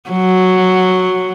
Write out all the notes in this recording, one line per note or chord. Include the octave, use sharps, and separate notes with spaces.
F#3